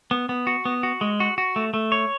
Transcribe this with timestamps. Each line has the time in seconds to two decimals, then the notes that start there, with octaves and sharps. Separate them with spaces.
0.11 B3
0.29 B3
0.47 F#4
0.65 B3
0.83 F#4
1.01 G#3
1.20 F#4
1.38 F#4
1.56 A3
1.74 A3
1.92 C#5